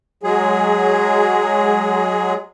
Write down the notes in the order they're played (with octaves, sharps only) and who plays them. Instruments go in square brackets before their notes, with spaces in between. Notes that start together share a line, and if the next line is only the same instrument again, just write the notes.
[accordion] F#3 G#3 G#4